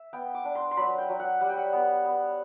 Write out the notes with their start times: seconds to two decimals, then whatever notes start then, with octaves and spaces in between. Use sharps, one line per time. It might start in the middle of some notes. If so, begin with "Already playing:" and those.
Already playing: E5
0.13 B3 G5
0.34 D6
0.45 D4
0.55 C6
0.71 C6
0.77 F#3 B5
0.98 G5
1.09 F#3
1.20 F#5
1.41 G3 F#5
1.49 G5
1.57 F#5
1.73 B3
2.05 B3